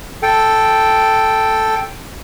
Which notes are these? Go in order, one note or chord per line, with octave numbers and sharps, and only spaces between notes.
A4 G5